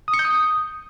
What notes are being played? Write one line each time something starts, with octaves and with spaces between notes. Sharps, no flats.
D#6
C#7
G6
D#6